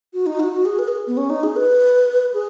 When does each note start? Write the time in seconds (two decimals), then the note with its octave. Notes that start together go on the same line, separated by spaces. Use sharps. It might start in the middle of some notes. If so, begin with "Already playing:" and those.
0.14 F#4
0.26 D#4
0.40 F#4
0.52 F#4
0.65 G#4
0.79 B4
0.88 G#4
1.07 B3
1.17 C#4
1.30 D#4
1.43 G#4
1.56 B4
2.34 G#4